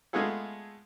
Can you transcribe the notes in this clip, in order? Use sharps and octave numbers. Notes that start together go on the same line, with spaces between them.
G#3 A3 B3 F4 G#4 A4